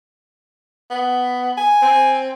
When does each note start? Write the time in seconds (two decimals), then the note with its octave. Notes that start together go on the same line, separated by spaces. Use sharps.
0.90 B3
1.58 G#5
1.82 C4